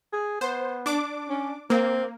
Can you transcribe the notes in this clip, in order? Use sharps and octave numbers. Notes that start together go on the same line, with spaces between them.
G#4
B3 C5
D4 D6
C#4
A#3 C4